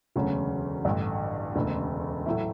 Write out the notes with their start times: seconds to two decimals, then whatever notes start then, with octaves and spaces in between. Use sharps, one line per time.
0.16 E1 D2 C#3 F#3 C#4
0.85 A1 G2 D3
1.55 E1 D2 C#3
2.26 A2 F#3 A3 E4